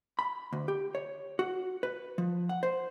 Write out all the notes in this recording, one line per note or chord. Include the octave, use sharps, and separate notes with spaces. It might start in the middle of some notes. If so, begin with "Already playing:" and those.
B5
D2
G4
C#5
F#4
B4
F3
F#5
C5